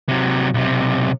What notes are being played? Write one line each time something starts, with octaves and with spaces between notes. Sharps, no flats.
C3 F#3
B1 C3